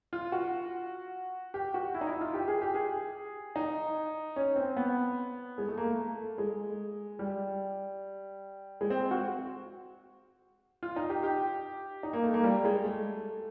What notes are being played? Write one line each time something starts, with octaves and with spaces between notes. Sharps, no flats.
F4
F#4
G4
F#4
E4
D#4
E4
F4
G4
G#4
G4
G#4
D#4
C#4
C4
B3
G#3
A3
A#3
A3
G#3
G3
G#3
C4
F#4
F4
D#4
G4
G4
D#4
A#3
A3
A#3
G3
G#3
A3